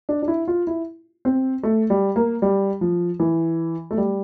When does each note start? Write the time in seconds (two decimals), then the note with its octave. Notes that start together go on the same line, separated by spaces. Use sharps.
0.09 D4
0.22 D4
0.28 E4
0.48 F4
0.67 E4
1.25 C4
1.63 A3
1.90 G3
2.16 A#3
2.42 G3
2.81 F3
3.20 E3
3.91 A3
3.98 G3